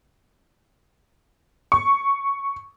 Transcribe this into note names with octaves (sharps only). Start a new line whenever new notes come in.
C#6